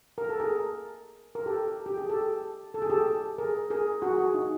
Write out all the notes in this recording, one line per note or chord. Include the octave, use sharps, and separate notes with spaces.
A#4
A4
G#4 A#4
A#4
G4 A4
G4
G#4
G4 A4
A4
G#4
G4 A4
G#4 A#4
G#4 A#4
F#4 G#4
F#4 G#4
D#4